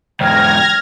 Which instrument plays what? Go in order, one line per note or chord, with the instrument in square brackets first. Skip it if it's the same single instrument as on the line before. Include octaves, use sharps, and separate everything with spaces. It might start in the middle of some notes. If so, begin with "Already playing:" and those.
[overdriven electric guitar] E2 G#2 [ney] G5 [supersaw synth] F6 G#6 A#6